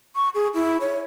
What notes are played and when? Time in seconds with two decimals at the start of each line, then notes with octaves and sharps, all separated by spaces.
0.16 C#6
0.34 G#4
0.54 E4
0.81 C#5